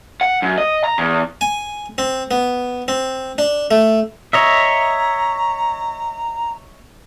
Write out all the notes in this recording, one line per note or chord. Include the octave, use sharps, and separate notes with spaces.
F#5
F#2
D#5
A#5
E2
G#5
C4
B3
C4
D4
A3
C#5 D#5 E5 A#5